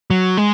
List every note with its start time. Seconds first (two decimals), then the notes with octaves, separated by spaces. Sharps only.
0.10 F#3
0.37 G#3